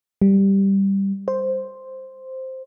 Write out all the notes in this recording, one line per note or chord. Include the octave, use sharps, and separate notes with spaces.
G3
C5